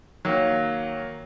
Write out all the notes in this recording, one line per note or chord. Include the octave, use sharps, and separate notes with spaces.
D#3 F#3 A#3